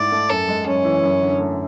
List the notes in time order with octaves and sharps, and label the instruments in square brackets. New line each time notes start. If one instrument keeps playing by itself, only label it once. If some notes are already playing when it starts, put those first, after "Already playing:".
Already playing: [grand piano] G#2 A3 E4 [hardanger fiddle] D5
[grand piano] A3
[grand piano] F#2 [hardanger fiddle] A4
[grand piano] G#3
[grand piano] F#2 [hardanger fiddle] C#4
[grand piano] E3
F#2
D3
A3